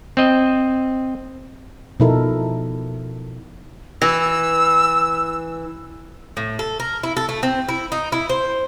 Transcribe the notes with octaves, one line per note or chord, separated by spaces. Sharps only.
C4 D#5
B2 F3 D#4 E4 A4 A#4
E3 E6
A2
A4
A#4
E4
A4
A3
C4
E4
D#4
E4
C5